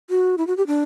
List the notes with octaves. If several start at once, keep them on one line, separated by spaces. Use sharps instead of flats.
F#4
E4
F#4
G4
D4